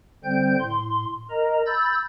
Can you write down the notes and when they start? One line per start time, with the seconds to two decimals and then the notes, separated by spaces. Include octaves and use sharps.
0.24 D3 G3 C4 C5 G5 G6
0.60 A2 C6
1.30 A#4 D#5 A#5
1.66 B5 E6 G6 A6